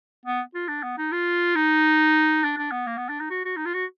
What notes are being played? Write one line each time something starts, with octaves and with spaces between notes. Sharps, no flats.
B3
F4
D4
B3
D#4
F4
D#4
D4
D4
B3
A#3
B3
D4
D#4
F#4
F#4
D#4
F4
F#4